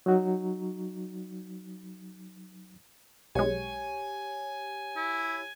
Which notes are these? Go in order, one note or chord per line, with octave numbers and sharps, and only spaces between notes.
F#3 D#4 F#4
B1 G#3 G4 C#5 G#5
E4